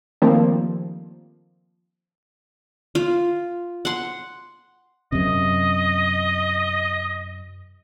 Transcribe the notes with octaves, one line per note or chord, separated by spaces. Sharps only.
D#3 F3 G3 A3 A#3 C4
F4
F#5 C6
F#2 C3 D#5